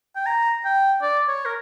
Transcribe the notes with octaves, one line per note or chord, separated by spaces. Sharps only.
G5
A#5
G5
D5
C#5
A#4